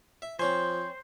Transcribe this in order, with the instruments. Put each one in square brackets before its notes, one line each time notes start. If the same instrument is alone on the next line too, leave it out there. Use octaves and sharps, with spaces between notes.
[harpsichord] E5
[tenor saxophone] F3 [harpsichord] C4 C#5 G#5 [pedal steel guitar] C5